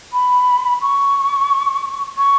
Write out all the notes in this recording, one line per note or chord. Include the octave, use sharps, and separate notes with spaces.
B5
C#6
C#6